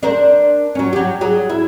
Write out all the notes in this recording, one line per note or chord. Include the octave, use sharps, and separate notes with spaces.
D4 A#4 C5
F#3 C#4
F#3 G4
F#3 G#4
E4